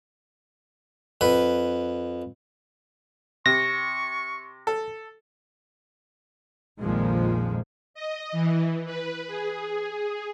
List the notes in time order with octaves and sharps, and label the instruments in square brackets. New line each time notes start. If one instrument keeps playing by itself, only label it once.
[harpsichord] F2 B4
[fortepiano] C3 [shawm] C#6 [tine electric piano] A#6
[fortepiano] A4
[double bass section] A#1 F2 A#2 D#3 F3 G#3
[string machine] D#5
E3
B4
G#4